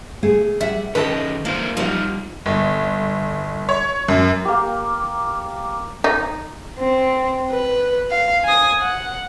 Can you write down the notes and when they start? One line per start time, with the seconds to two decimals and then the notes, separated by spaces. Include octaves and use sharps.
0.23 A3 G#4
0.61 G3 E5 F#5
0.95 D#3 C#4 G4 A4 B4 D#5
1.45 A#3 D4 E4 C5
1.77 F3 G3 D#4 F4 F#5
2.46 G1
3.69 C#5
4.08 F#2
4.45 A#3 G4
6.04 D#4
6.79 C4
7.51 B4
8.11 F5
8.44 G#5 D#6
8.81 F#5